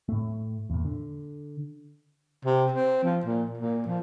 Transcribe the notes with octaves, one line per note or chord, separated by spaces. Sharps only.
A2 A3
E2 A#2
D3
C3
C4
F3
A#2
A#2
F3